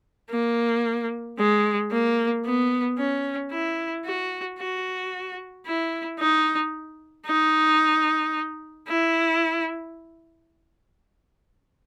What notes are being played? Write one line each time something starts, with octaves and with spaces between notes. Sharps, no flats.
A#3
G#3
A#3
B3
C#4
E4
F#4
F#4
E4
D#4
D#4
E4